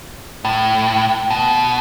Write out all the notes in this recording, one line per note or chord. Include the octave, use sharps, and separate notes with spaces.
A2
B2